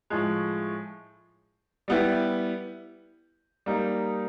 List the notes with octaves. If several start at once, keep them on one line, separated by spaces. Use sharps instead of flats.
A2 F3 G#3
G3 B3 E4 G4
G3 A#3 D#4